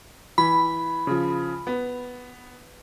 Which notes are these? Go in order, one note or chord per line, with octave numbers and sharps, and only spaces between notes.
E3 B5
C#3 F3
B3